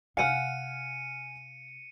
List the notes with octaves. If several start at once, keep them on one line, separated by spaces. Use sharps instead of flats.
C3 F5 F#5 G#5 F6 C#7 D#7